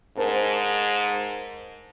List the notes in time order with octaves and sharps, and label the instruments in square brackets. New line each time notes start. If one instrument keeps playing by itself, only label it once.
[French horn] G#2 [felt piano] A#4 C5 A5